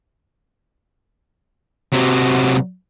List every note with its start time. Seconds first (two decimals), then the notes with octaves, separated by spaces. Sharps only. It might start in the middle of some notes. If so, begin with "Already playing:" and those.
1.93 C3 F#3